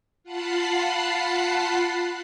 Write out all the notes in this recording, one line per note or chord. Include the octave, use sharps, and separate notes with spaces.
F4 F#5 A5 B5 F#6 C7